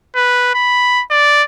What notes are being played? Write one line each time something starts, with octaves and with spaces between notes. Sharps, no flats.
B4
B5
D5